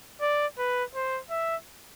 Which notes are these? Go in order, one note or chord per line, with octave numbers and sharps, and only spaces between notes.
D5
B4
C5
E5